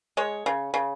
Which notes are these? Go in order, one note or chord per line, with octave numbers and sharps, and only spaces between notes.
G#3 C#5
C#3
C#3